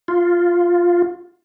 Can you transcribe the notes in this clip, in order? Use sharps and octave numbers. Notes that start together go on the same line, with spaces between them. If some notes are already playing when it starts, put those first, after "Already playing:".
F4